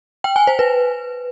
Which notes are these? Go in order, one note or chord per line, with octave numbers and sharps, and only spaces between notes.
G5
G#5
C5
B4